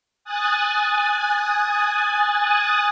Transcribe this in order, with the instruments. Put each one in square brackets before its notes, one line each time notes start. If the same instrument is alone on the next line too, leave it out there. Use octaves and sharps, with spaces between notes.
[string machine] G#5 D#6 F#6 A6